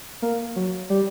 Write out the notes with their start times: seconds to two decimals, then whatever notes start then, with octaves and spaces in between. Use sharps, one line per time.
0.22 A#3
0.56 F#3
0.90 G3